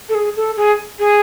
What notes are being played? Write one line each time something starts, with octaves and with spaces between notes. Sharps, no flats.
A4
G#4
A4
G#4
G#4